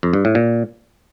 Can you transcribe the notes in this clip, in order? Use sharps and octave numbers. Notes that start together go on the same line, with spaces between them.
F2
G2
A2
A#2